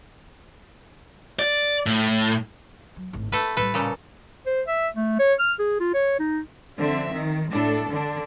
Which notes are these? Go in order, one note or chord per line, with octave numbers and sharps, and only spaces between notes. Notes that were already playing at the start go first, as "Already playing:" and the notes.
D5
A2
F#3
G#1 A2
A3 D4 A4 B4
A2 G3 A4 B4
A#2 C#3 A4
C5
E5
A3
C#5
F6
G#4
F4
C#5
D#4
D3 F3 C4 E5
D#3
A2 D4 A4
D3 D4